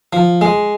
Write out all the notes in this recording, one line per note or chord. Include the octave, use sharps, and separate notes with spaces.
F3
G#3